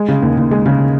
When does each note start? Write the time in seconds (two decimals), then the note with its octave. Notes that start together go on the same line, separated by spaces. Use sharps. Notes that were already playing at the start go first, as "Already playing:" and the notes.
Already playing: G#3
0.08 C#3
0.22 D#2
0.37 D#2
0.51 G#3
0.66 C#3